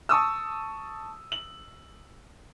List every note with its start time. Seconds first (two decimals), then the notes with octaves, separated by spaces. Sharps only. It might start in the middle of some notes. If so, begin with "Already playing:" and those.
0.09 A5 C#6 D#6 E6
1.32 F#7